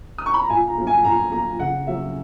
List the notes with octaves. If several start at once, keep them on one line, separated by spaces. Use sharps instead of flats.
D#6
C#6
B5
A#5
A#2 G#5
A#5
F#3 A#3
G#5
A#2 A#5
F#3 A#3 A#5
C#3 F#5
F#3 A#3 E5